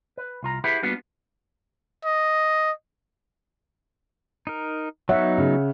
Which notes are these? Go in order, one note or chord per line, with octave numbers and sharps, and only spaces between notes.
B4
C2 F4 A#5
E4 G4 G#4 B4 F5 F#5
G3 A#3 B3 D4 F4 F#4
D#5
D#4 A#4
F#3 B3 D#4 C#5 E5 F#5
C#3